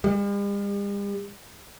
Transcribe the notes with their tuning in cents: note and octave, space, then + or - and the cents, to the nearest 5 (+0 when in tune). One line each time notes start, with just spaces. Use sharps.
G3 +45